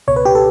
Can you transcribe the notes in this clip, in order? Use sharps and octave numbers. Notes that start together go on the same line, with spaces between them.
C#2 B2 C#5
B4
G4
A4